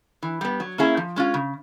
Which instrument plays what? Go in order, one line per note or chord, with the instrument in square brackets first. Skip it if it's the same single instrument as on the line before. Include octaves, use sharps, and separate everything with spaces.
[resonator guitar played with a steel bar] E3
G3 B3
F#3
A#3 C#4 E4 G#4
F3
G#3 C#4 F4
C#3